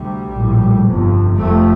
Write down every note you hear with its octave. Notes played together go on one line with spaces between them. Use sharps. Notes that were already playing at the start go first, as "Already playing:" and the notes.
Already playing: D2 C3 G3
A#1 A2
G1 F2 C3
F1 F2 C3 A3